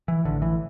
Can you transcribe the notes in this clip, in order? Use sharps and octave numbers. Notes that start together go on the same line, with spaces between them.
E3
A1 D3
E3